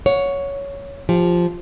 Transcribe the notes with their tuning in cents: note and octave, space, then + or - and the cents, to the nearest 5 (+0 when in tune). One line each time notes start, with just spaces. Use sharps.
C#5 +10 F#5 -30
F3 +0 G4 +20